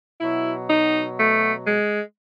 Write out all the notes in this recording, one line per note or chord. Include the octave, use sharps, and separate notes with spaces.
B2 F#3 E4
D#4
A3
G#3